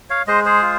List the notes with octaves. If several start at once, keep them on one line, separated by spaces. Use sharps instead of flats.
C#5 F5
G#3 C5 D#5
G#4 C5
F4